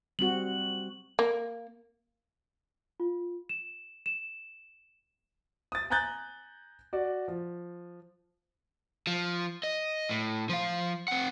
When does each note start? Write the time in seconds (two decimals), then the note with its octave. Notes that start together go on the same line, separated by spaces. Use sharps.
0.19 G3 C4 F#4 F#7
1.19 A#3
3.00 F4
3.49 E7
4.06 E7
5.72 D#6 A6
5.90 G#5 A#5 D#6 F#6 G6 A6
6.93 F#4 D5
7.28 F3
9.07 F3
9.63 D#5
10.10 A2
10.49 F3 F5
11.08 C4 F#5